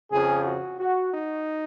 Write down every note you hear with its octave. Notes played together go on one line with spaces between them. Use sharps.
F2 C#3 F3 G#4
F#4
F#4
D#4